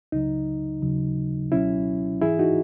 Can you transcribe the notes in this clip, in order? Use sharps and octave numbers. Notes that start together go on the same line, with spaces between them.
C#2 C#3 F#3 D#4
D#2 C#3 F#3
C#2 B2 F#3 C#4 E4
G#2 E3 E4 G#4
D#4 F#4